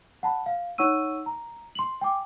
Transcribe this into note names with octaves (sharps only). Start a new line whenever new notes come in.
F#5 A5 B5
F5
D#4 C#5 F#5 C#6 E6 D#7
A#5
C6 F#7
G5 G#5 D6